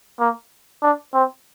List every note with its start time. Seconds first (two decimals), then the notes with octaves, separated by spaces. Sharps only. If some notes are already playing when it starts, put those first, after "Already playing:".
0.20 A#3
0.82 D4
1.14 C4